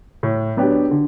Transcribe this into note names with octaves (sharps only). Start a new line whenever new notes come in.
A2
F#3 B3 D4 G4
D3